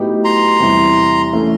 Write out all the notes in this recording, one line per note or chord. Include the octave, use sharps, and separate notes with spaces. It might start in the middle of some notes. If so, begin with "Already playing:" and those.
Already playing: A2 F#3 B3 D#4 G4
A#5 C6
E2 C3 E3 G3
E3 A3 C#4